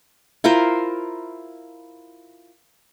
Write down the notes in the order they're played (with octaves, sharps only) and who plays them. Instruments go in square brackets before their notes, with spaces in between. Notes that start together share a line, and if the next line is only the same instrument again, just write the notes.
[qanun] E4 F4 A#4 C5